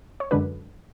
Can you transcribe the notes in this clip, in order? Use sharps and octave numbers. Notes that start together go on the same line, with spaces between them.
C#5
F#2 D3 G#3 D4 B4